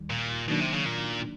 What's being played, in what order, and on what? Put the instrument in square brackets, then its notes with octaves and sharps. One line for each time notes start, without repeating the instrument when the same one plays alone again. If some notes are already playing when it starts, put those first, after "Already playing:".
Already playing: [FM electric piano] D#2 D#3 G3
[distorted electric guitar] A#2
[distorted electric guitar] B2 [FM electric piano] D#3 F#3 A#3 D4
[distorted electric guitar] C3
C#3
A#2